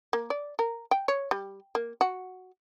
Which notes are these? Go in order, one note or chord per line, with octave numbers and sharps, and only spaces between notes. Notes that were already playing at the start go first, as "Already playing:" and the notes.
A#3
D5
A#4
G5
C#5
G3
A#3
F#4